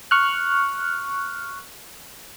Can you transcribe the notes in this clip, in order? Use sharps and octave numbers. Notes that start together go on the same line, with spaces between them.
C#6 F6 F#6